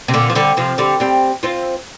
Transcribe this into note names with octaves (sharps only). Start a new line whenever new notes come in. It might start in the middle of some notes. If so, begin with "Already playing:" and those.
C3
A#2 D3
F3
D3 G3
C3 F3
D3 G3
G3 C4
C4 F4